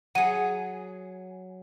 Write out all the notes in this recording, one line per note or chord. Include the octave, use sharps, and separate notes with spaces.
F#3 G#4 F#5 D#7